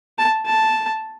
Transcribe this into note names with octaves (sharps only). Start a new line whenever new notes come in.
A5
A5